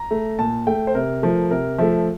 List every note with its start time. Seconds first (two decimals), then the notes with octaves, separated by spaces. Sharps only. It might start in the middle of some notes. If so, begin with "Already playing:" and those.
Already playing: A#5
0.11 A3
0.39 A#2 A5
0.67 A3 G5
0.87 C5
0.95 C3 A#4
1.22 F3 A3
1.51 C3 A#4
1.78 F3 A3 E5